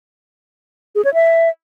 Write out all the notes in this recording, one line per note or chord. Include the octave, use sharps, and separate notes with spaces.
G#4
C#5
E5